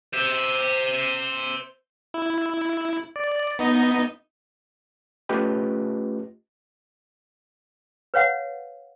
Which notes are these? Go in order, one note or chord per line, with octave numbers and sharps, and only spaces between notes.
C5 E5
E4
D5
B3 D#4 D#5
A3 C#4 F4 G4 B4 D#5
B4 C#5 F5 F#5